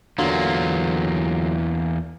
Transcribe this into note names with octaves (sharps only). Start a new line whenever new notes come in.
E2 D3 F#3 A#3 F4